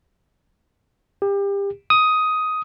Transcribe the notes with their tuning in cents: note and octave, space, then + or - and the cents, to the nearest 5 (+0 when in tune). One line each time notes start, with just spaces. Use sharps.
G4 +30
D#6 +10